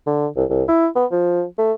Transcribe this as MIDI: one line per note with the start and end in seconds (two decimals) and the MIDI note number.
0.06 0.27 50
0.36 0.45 36
0.50 0.63 36
0.68 0.87 64
0.96 1.05 59
1.11 1.44 53
1.58 1.73 57